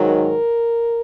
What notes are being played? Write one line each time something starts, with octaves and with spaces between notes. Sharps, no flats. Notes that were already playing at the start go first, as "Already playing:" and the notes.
Already playing: G#2 D#3 F#3
A#4